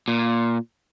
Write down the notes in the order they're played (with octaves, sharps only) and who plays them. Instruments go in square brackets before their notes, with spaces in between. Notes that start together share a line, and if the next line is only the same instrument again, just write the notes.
[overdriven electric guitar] A#2